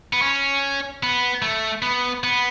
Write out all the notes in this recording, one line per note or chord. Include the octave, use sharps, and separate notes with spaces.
B3
C#4
B3
A3
B3
B3